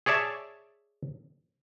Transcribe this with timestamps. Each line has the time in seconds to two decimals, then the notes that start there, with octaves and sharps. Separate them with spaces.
0.06 G#4 C#5 D5 E5 A5